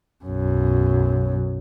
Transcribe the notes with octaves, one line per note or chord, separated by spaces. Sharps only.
B1 F#2